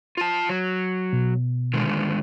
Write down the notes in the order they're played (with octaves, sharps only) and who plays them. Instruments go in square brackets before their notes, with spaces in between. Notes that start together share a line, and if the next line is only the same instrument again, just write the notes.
[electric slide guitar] F4 A5
F#3
[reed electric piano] B2
[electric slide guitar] D3 D#3 G#3